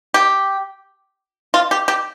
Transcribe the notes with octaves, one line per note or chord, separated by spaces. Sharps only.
G4
F4
G4
G4